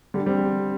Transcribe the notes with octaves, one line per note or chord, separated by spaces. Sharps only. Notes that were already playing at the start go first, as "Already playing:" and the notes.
D3 G3
G3 C4